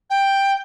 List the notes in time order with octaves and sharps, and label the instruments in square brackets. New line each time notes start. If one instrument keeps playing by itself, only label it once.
[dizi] G5